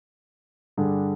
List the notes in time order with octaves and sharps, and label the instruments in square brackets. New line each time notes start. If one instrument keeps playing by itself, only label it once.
[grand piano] G2 D3 G3 D4 G#4